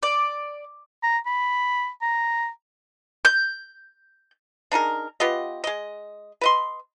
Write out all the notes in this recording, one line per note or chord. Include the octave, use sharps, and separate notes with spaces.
D5
A#5
B5
A#5
G6
D4 D#4 G#4 A#4
B3 F4 G4 D#5
G#3 D#5
B4 D#5 C6